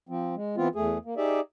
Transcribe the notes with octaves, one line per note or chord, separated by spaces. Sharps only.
F3 C4
G#3
E3 B3 C4 F4
E2 A3 G#4
A#3
D#4 G4 G#4 D5 E5